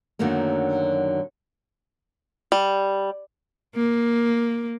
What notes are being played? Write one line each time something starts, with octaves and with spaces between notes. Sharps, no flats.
F#2 D3 D#3 F#3 A3 A#3
G3
A#3